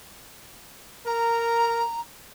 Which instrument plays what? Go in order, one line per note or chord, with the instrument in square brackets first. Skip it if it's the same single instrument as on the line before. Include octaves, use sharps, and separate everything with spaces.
[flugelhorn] A#4 [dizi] A#5